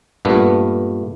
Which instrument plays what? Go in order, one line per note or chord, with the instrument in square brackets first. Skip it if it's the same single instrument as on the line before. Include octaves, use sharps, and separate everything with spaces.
[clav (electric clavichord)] G2 A#2 A3 B3